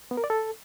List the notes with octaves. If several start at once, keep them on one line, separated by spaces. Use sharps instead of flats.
B3
A#4
D5
A4